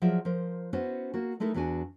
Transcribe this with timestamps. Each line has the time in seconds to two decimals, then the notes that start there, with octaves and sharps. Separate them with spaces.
0.02 F3 F#3 F4 G#4 D5 E5
0.25 F3 A#4 C5
0.73 B3 C#4 E4 F#4 C5
1.14 A#3 F#4
1.40 G#3 A3 D#4 E4 A4 A#4
1.54 E2 B3 D4 F#4 G#5